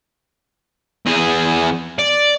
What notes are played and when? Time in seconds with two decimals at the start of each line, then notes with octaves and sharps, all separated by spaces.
1.06 E2 G#4
1.99 D5